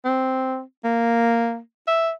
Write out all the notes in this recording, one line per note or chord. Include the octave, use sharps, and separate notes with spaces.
C4
A#3
E5